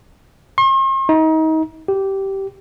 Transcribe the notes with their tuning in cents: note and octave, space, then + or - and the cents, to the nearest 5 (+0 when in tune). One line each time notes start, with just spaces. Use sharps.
C6 +45
D#4 +30
G4 -15